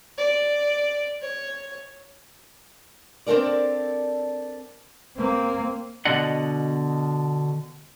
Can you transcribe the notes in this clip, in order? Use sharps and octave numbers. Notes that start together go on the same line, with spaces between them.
D5
C#5
C4 D4 A4 A#4 D5
A#3 C4
B2 D3 D5 D#5 F#5